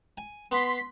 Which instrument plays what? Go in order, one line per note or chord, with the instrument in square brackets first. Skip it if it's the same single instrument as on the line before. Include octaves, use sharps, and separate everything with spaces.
[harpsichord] G#5
[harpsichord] B3 [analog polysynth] C6 B6